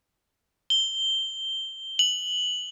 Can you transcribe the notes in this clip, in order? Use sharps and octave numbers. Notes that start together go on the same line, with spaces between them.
G7
F#7